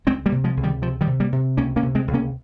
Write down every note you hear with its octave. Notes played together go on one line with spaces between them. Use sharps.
C#2 G#3 C4
G3 A#3
C3
F3 G#3
C#2
D#3 G3
C3 F3
D#3 G3
C3
G3 A#3
C3
C#2 A#3 C#4
A#3 C#4
C3
G#3 C4
C#2
A#3 C#4